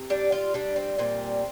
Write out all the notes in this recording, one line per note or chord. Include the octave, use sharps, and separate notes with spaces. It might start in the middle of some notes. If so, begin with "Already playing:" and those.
Already playing: C3
G3 D4
F4
G3 D4
C4
A#2 C4